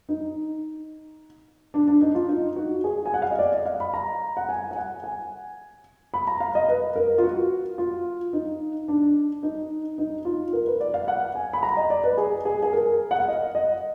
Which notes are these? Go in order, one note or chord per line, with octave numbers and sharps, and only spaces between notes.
D#4
D4
D4
D#4
F4
D#4
F#4
G#4
G#5
F#5
F5
D#5
D5
D#5
F5
B5
A#5
F#5
G#5
G#5
F#5
G#5
B5
A#5
F5
D#5
B4
A#4
F4
F#4
F4
D#4
D4
D#4
D#4
F4
A#4
B4
D5
F5
F#5
G#5
B5
A#5
D#5
D5
B4
G#4
G#4
G#4
A#4
F#5
F5
D#5
D#5